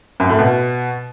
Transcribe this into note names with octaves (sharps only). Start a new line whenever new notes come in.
F#2
A2
B2